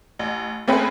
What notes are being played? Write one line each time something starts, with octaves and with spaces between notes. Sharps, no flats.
A1
A3 A#3 C4 C#4 G#4 B4